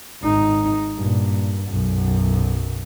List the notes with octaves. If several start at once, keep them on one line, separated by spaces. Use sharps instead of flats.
G#1 D#4
G2 A#2
B1 F#2